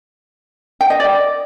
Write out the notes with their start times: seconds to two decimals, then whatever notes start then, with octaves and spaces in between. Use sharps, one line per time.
0.81 G5
0.90 D#5
1.00 D5